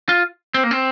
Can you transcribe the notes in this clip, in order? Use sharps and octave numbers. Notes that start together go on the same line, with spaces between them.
F4
C4
A#3
C4